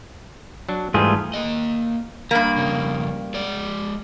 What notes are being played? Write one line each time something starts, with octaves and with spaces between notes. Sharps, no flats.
F#3 D4
G#2 E3 G3 A3 F4 G#4
A#3 D#5
G2 A#3 A#5 B5
F2 C#3
G#3 D5